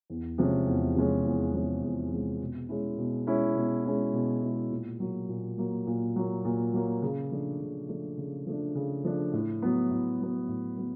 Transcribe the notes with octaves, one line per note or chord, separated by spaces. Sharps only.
E2
C3 F3 G#3 C#4
E2
C3 F3 G#3 C#4
E2
C3 F3 G#3 C#4
E2
C3 F3 G#3 C#4
B2
G#3 C#4 E4
B2
G#3 C#4 E4
B2
G#3 C#4 E4
B2
G#3 C#4 E4
A#2
F#3 A#3
A#2
F#3 A#3
A#2
F#3 A#3
A#2
F#3 A#3
C#3
F3 A3 D4
C#3
F3 A3 D4
C#3
F3 A3 D4
C#3
F3 A3 D4
A2
F#3 B3
A2
F#3 B3
A2
F#3 B3